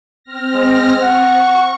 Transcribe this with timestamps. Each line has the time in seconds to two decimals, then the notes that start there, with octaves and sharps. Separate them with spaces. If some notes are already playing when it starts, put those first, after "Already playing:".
0.23 C4 F6 A#6
0.53 G#3
1.01 F#5 C#6